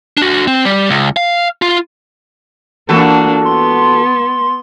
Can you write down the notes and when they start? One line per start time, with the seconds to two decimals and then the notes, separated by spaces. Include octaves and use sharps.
0.17 D4 F#4
0.47 C4
0.65 G3
0.90 C#2
1.17 F5
1.62 F4
2.89 E3 A#3 D4 F#4 A4
3.45 B3 C6